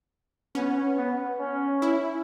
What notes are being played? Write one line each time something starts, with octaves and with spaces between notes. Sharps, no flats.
B3 C#4
B3
C#4
E4